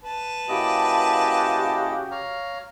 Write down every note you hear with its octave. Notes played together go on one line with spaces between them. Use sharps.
B4 A5
C#3 A#3 E4 F#4 G4 D#5
C#5 F5 A#5